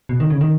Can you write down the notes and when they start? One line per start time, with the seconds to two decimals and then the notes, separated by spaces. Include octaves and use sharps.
0.09 B2
0.20 D#3
0.30 C#3
0.41 D#3